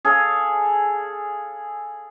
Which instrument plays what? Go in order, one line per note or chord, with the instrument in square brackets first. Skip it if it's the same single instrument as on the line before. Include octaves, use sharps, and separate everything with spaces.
[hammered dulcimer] G#4 A4 F5